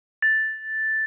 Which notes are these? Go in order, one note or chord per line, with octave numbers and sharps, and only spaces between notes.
A6